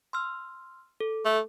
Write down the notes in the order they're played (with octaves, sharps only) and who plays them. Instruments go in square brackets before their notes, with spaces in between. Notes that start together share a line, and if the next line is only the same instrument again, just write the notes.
[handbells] C6 E6 F6
A4
[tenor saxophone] A3